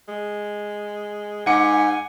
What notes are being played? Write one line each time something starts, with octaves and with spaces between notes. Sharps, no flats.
G#3
G#2 F#5 G#5 D6 C#7